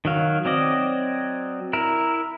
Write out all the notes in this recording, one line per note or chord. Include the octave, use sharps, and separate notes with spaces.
D#3 F#3 F5
F#3 C4 D5 D#5
E4 A#4